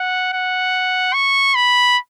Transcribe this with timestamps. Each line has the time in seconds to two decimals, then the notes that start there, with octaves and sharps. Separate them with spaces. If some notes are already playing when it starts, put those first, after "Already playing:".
Already playing: F#5
0.33 F#5
1.14 C#6
1.55 B5